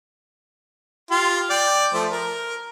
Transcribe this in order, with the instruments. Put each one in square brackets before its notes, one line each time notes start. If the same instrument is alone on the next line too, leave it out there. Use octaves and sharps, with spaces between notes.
[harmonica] F4 G4 C6
D5 G5
F3 A3 C5
A#4